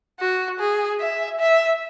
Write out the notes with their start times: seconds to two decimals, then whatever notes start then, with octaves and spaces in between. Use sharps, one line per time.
0.20 F#4
0.60 G#4
1.00 E5
1.40 E5